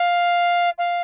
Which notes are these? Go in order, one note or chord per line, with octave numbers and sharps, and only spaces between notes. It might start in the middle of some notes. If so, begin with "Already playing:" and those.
Already playing: F5
F5